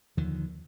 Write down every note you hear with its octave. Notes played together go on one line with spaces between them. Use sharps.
D#2 D3 D#3 F3